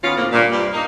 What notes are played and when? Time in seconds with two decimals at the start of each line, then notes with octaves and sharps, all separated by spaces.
0.02 D#2 B3 C#4 F4
0.15 A2 C#3 F3 A#3 C4
0.31 G2 A#2
0.52 G2 C3 G3
0.73 A#3 D#4